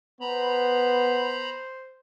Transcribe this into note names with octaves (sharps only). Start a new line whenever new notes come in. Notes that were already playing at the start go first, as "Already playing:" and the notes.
B3 C5 A#5 B5